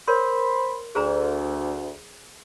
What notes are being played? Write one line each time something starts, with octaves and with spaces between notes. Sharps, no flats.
A#4 C5 C#5 B5 C6
D2 G#4 C5 A#5